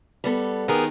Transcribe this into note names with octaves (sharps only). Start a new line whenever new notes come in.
G3 B3 A4
D#3 B3 G4 G#4 A#4